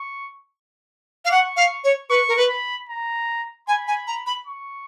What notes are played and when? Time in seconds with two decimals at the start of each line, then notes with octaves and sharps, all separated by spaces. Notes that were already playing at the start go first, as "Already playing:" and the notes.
Already playing: C#6
1.25 F5
1.30 F#5 C#6
1.57 F5
1.84 C#5
2.10 B4 C#6
2.28 A#4
2.37 B4
2.49 B5
2.89 A#5
3.68 G#5 B5
3.87 G#5
4.07 A#5
4.26 B5
4.47 C#6